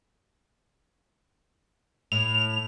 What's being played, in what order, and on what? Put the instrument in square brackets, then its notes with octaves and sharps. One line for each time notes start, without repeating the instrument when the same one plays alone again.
[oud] A2 [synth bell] F7